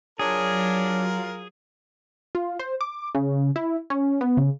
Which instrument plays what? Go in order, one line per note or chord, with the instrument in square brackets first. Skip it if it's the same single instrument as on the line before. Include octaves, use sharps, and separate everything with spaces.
[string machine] F#3 [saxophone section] D4 C#5 [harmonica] F4 A#4 [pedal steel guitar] G#4
[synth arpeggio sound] F4
C5
D6
C#3
E4
C#4
B3
C#3